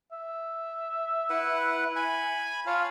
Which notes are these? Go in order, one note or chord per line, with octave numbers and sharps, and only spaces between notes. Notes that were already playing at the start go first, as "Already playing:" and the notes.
E5
E4 B4 F#5
G#5 B5
F4 C#5 F5 A5